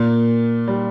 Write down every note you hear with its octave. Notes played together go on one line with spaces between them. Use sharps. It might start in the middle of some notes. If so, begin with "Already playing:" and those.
Already playing: A#2 A#3
G3